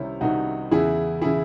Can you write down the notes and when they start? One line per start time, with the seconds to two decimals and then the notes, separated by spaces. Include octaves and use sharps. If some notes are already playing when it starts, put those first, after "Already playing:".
Already playing: C2 C3 D#3 C#4 E4
0.21 C2 C3 D#3 D#4 F#4
0.71 E2 C#3 E3 E4 G#4
1.21 C#3 E3 E4 G#4